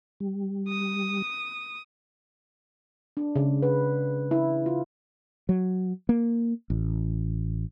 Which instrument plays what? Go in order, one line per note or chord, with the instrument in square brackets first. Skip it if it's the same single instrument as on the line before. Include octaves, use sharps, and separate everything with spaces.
[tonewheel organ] G3
[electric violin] D#6
[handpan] D4
C#3
B4
E4
F4
[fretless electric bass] F#3
A#3
A1